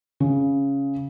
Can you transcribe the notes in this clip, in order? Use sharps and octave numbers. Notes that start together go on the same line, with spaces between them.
C#3